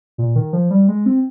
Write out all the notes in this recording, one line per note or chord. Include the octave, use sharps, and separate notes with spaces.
A#2
D#3
F3
G3
G#3
C4